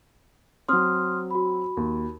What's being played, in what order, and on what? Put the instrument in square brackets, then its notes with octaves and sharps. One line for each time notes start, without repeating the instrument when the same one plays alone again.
[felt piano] F#3 C4 [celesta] C6 D#6 F6
[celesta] F#4 B5
[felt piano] D#2